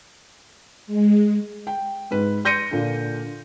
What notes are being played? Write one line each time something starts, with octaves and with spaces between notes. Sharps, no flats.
G#3
G5
G#2 B4
C6 G6 A#6 C#7 D#7
A#2 D3